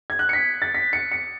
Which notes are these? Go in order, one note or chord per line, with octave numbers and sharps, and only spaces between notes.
G#6
F#6
C#7
B6
A6
B6
C#7
C#7